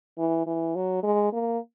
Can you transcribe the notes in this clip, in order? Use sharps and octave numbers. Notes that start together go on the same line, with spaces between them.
E3
E3
F#3
G#3
A#3